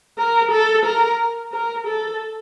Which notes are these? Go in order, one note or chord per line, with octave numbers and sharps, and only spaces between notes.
A#4
A4
A#4
A#4
A4